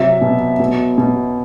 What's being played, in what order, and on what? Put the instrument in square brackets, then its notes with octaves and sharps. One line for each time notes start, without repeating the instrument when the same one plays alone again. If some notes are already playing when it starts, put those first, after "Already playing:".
Already playing: [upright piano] C3 F#3 E5
B2
B2
B2